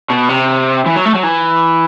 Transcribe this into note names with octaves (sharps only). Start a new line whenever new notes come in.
B2
C3
E3
F#3
A3
F#3
E3